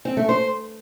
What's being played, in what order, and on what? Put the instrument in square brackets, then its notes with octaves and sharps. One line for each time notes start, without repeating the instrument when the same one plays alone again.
[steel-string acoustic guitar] C4
A3
C5